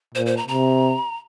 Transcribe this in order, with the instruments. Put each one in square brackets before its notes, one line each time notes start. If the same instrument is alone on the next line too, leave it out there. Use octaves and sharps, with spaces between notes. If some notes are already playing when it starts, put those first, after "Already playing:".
[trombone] A#2 [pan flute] C5
[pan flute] C5
A#5
[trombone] C3 [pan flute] A#5